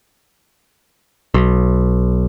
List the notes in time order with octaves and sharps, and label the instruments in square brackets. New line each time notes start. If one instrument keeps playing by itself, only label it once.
[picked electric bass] B1